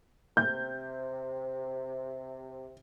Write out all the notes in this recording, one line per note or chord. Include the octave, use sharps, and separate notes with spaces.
C3 G6